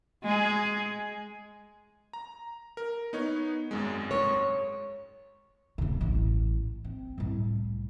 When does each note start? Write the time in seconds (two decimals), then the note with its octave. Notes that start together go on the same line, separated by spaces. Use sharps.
0.23 G#3 G#4
2.13 A#5
2.77 A#4
3.13 B3 D#4 C#5
3.71 G#1 F#2 G#3
4.11 C#5
5.78 D1 C#3
6.01 A1
6.85 C4
7.18 C2 A2